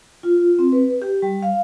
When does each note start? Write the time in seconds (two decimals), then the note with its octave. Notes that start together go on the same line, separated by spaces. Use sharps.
0.23 F4
0.59 C4
0.72 B4
1.02 G4
1.22 G3
1.43 F5